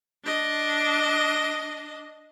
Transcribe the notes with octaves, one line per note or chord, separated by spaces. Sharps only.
D4 D#5